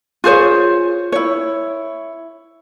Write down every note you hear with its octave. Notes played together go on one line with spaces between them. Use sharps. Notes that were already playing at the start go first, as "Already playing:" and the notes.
F4 G#4 C5 C#5
E4 C#5